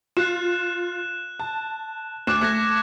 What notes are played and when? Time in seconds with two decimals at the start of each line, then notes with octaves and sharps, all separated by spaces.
0.17 F4 F#6 E7
1.40 A5
2.27 D2 D6 F#6 E7
2.41 A3 F#6 G#6 A#6